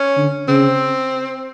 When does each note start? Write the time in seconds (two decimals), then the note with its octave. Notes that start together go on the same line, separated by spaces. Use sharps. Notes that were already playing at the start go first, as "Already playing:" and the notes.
Already playing: C#4
0.17 D3
0.48 C#3 C4